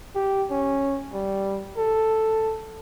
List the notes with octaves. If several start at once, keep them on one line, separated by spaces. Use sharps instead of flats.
G4
C#4
G3
A4